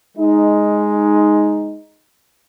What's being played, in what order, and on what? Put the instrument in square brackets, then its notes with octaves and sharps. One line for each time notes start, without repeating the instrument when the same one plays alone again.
[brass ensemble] G#3 D#4